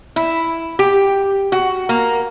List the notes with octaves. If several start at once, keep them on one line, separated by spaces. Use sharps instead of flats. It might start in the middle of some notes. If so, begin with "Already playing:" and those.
E4
G4
F#4
A#3